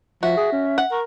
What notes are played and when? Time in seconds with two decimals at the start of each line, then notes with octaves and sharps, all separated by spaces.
0.23 F3 F#4 E5
0.37 G#4
0.52 C#4
0.78 F#5
0.91 A#4 C#6